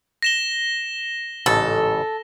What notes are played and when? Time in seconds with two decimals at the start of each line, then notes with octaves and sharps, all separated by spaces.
0.23 A#6 E7 G7
1.46 A1 G#2 C#3 A4